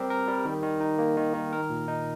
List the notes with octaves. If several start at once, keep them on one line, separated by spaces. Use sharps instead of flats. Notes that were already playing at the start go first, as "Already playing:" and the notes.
Already playing: G3 C4 G4 A#4
A#4
G3
D#3
D#3
D#4
A#3
D#3
D#3
A#4
A#2
D#4